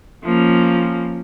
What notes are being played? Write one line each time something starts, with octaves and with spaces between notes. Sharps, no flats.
F3 A#3 C#4